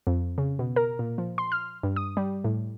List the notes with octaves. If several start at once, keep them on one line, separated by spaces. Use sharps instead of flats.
F2
C#3
B2
A#4
A#2
F3
C6
F6
G2
D#6
G3
A2